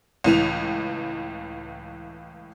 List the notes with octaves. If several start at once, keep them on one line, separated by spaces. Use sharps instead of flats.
C#2 A2 E3 F7